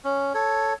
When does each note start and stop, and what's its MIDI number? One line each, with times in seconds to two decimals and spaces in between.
0.04 0.33 61
0.34 0.74 69
0.34 0.74 73